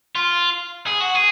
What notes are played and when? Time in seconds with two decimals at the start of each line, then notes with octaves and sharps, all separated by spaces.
0.15 F4
0.87 G#4
1.01 F#4
1.15 G#4